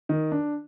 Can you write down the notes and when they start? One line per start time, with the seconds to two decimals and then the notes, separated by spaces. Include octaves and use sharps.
0.09 D#3
0.32 D4